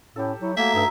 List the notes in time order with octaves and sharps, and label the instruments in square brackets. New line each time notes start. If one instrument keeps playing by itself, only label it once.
[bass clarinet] A2 [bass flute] C#4 [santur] G4 A4
[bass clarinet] F#3 [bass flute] E4
[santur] F#3 G#5 [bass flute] A3 [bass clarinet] A#3 [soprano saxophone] E5
[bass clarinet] G2 [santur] D#4 A#5 E6